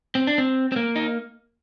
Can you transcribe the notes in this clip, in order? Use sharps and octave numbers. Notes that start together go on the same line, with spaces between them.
C4
D4
C4
C4
A#3
D#4